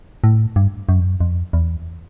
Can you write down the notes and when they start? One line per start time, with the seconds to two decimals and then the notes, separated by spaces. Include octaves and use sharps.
0.24 A2
0.56 G2
0.89 F#2
1.00 F2
1.04 F#2
1.20 F2
1.53 E2